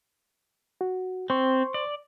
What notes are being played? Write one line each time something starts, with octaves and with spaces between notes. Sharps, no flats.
F#4
C4 C5 C6 C#6
D5